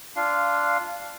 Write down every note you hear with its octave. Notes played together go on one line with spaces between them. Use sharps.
D4 F4 F5